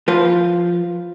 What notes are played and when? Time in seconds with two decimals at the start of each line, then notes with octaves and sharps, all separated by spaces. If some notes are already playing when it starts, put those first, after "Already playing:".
0.08 F3 F4 B4 C5